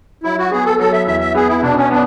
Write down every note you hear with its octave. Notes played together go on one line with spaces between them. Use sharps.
F#3 E4
F#4
B3 G#4
A4
F#3 A4
E5
E2 E5
E5
B3 G#4
E4
B2 D4
C#4
B3 D4